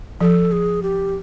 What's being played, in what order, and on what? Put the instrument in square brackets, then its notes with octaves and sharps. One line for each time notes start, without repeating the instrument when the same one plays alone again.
[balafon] F3 [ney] A4
[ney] G#4
G4